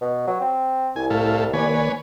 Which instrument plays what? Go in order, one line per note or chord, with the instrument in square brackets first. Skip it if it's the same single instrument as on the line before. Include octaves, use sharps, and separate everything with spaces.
[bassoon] B2
F#3
C4
[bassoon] C2 [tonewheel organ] E4 [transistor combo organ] G#5
[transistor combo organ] A2 A4 F5
[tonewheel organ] D#3 A#3 D5 [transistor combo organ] B4 C#5 G#5